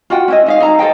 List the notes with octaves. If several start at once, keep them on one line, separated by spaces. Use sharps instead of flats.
F4 F#4 F#5 G5
C#4 E4 D#5
D#4 E5 F5
D#4 A4 A#5
A4 C5 D#5 G5